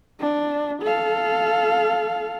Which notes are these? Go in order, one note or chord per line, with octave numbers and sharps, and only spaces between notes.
D4
A4 F5